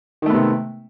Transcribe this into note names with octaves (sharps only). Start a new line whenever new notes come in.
C3 D#3 A3 B3